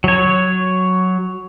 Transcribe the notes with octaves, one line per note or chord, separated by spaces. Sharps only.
F#3 C#5